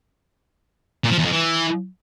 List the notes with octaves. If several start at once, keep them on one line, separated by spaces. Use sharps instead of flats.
A#2
F3
E2
F2
E3